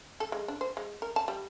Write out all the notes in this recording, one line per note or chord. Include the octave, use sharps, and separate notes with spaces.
A4
G#3
D4
C5
G#3
A#4
A5
G3